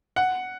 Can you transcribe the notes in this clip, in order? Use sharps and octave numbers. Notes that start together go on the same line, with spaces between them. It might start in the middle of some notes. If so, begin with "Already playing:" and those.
F#5